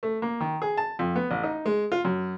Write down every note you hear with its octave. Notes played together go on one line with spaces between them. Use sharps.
A3
A#3
D#3
G#4
A5
F2
B3
A1
D#4
G#3
F4
F#2